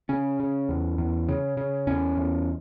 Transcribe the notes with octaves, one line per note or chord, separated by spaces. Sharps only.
C#3 C#4
C#3
E2
E2
C#3
C#3
E2 C#4
E2